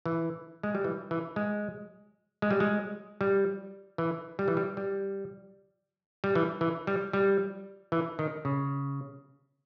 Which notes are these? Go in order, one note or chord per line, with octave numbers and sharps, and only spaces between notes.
E3
G#3
G3
E3
E3
G#3
G#3
G3
G#3
G3
E3
G3
E3
G3
G3
G3
E3
E3
G3
G3
E3
D#3
C#3